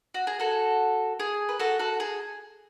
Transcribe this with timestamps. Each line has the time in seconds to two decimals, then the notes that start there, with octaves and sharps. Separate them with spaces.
0.14 F#4
0.27 G#4
0.40 F#4 A4
1.20 G#4
1.49 B4
1.60 F#4 A4
1.79 F#4 A4
2.00 G#4